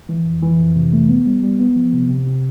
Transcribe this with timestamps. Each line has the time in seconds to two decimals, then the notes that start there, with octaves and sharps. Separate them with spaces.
0.09 E3
0.26 F2
0.42 E3
0.60 F2
0.76 C3
0.93 A3
1.09 B3
1.26 G3
1.43 G3
1.60 B3
1.76 F3
1.93 C3
2.10 C3
2.27 C3